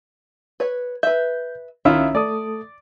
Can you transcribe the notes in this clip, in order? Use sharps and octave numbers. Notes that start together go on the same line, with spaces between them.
B4 C#5
B4 E5 G6
C2 D#3 C#4 E4 F4 E5 E6
A3 A4 D5 D#6